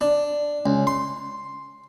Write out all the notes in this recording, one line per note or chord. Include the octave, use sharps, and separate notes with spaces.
D4
C#2
C6